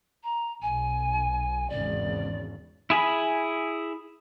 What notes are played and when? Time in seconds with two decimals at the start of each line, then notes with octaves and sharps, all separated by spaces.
0.23 A#5
0.62 B1 G#5
1.69 G#1 E2 C#3 D5
2.90 E4 G#4 G#5 B5